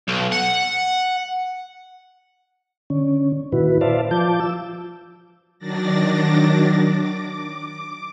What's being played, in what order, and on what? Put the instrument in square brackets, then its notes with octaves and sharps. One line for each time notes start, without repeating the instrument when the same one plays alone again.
[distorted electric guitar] B1
F#5
[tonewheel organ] D3 C#4
A#2 D#3 E4 F#4 B4
B4 C5 D5 E5 F5 A5
F3 F4 A5 D6 G6
E6
[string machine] D#3 F#3 D4 D5 A6 A#6
D6